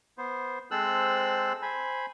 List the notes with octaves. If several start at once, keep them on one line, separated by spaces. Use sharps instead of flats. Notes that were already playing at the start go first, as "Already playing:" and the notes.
B3 C5
G#3 C4 A4 C5 E6 F#6
C5 G#5 B5